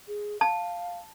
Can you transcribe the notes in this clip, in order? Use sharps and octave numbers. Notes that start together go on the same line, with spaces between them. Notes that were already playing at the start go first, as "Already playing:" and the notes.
G#4
F5 A5